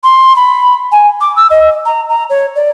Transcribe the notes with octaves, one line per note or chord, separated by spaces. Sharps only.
C6
B5
G#5
D6
E6
D#5
A#5
A#5
C#5
D5